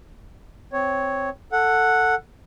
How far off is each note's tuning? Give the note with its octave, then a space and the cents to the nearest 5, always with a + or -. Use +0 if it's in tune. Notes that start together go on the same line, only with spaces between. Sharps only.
C4 +0 C#5 +0
A4 +15 F#5 -5